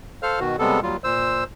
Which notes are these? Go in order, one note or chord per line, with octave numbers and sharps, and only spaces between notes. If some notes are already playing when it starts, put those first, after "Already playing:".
A4 C5 F5 F6
B2 D#3 F#4
C3 G3 G#3 B3 A4
D#2 F#3 G3 F4
A#2 C5 E6